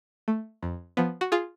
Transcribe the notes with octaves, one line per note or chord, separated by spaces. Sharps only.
A3
F2
F3 B3
F#4
F4 G#4